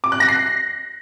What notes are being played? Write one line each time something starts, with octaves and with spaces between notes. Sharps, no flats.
D6
F#6
A#6
C7